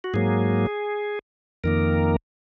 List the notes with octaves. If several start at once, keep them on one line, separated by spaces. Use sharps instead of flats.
F#4
G#2 F#3 A#3 G#4
F2 D#3 A#3 A#4